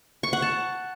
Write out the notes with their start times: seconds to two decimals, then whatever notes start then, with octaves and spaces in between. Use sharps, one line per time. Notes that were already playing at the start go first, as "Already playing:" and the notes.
0.23 C#6
0.33 F#5
0.42 A5